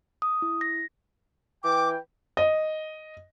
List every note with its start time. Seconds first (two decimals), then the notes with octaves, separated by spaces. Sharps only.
0.22 D#6
0.42 E4
0.61 A#6
1.64 E3 G5 D6
2.37 D#5